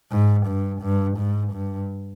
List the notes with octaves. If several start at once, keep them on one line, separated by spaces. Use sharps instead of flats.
G#2
G2
G2
G#2
G2